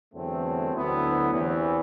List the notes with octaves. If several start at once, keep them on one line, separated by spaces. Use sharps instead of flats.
E2 D3 F#3 A3 C4
D2 D3 F#3 B3 E4
E2 C3 E3